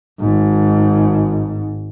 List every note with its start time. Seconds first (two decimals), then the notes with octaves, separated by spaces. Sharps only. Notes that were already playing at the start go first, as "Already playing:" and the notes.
0.20 G#1 G#2